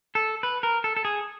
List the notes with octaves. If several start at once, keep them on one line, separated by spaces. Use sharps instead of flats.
A4
B4
A#4
A4
A4
G#4